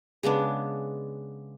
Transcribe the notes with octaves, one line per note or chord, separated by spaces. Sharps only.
C#3 G#3 B3 D4